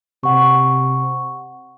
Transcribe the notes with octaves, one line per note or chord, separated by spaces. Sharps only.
C3 F#5 C#6